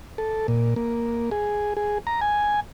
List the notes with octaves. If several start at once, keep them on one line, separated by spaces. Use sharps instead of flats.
A4
A#2
A#3
G#4
G#4
A#5
G#5